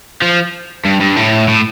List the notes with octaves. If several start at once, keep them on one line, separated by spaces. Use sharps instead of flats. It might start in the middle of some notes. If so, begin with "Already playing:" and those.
F3
G2
G2
A2
A2